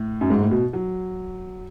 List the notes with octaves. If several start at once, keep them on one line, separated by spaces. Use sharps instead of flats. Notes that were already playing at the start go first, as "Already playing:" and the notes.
Already playing: A2
F#2
G#2
A2
B2
F#3